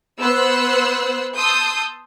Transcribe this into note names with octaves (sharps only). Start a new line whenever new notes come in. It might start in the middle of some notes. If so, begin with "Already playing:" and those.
B3 C5 E6 F#6
A5 C6 D#6 E6 G6